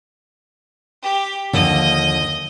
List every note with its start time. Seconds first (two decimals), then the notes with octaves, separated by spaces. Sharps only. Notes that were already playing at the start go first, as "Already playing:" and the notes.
1.03 G4
1.53 D#2 D3 F3 D#5